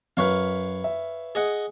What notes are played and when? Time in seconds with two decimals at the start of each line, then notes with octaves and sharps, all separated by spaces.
0.17 F#2 B4 C#5 F5 C#6 F6
0.84 E5
1.35 G#4 D#5 F#5